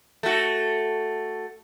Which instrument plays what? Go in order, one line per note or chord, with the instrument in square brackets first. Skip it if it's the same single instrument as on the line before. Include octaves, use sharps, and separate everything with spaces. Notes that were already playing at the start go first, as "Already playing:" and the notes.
[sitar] A3 F#4